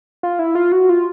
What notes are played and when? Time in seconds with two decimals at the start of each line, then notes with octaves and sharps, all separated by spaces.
0.23 F4
0.39 E4
0.55 F4
0.72 F#4
0.89 F4